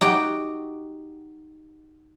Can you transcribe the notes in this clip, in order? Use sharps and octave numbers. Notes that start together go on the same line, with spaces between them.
D#4 F#4 G4 G5